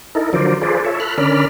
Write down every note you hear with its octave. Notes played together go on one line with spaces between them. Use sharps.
D#4 E4 A4 A#4
D3 F3 F#3 A#4 C5 D5
F4 G#4 A4 B4 C5 D5
F4 A4 C#5 E5
A4 B5 F6 F#6
D3 C#4 A#4 D5 B5 F6